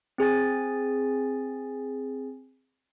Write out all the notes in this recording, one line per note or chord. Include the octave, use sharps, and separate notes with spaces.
C4 G#4 G#5 A6